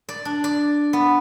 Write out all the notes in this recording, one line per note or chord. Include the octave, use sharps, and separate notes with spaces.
D5
D4
D5
B3